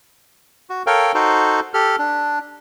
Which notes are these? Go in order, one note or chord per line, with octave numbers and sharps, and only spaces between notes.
F#4
A4 A#4 C#5 F5 G5
D#4 F#4 A4 C5
G4 A4 F6
D4